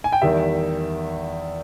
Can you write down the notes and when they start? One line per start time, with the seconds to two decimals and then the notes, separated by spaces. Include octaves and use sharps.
0.04 G#5
0.12 G5
0.22 E2 D#3 G3 E5